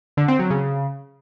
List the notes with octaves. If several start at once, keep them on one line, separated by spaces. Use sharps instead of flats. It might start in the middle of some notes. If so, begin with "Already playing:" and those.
D3
C4
F#3
C#3